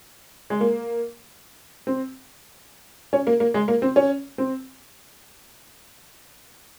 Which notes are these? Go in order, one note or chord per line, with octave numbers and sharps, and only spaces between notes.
G#3
A#3
C4
C#4
A#3
A#3
G#3
A#3
C4
C#4
C4